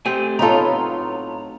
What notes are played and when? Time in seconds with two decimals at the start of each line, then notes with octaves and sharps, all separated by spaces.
0.06 A3 C4 G4 G#5
0.39 A2 F#3 B3 D#4 F4 A4 A#5